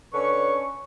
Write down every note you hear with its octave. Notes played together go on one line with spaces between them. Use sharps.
D3 C#4 B4 C#6